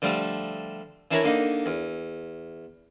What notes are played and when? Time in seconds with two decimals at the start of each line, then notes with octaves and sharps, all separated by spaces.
0.02 D3 F3 G3 A3
1.11 E3 D4 E4 A#4 C#5 A#5
1.24 D3 A#3 D#4
1.66 E2